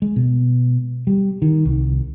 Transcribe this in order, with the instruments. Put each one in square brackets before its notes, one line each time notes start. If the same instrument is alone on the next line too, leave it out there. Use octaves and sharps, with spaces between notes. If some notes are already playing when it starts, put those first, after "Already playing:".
[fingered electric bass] G#3
B2
G3
D#3
C2